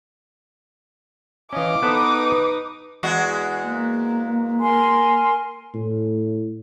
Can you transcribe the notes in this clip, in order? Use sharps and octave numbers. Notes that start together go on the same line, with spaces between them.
E3 C#4 D#5 F5 D6
B3 D#4 A4 B4 C5 D#6
E2 G#3 F#4
A#3
A#4 G#5 C6
A2